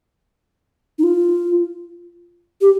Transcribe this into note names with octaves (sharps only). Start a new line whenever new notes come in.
D#4
F4
G4